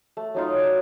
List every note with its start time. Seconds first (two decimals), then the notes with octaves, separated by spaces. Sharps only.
0.17 A3
0.35 F#3 D#4 F4
0.58 D5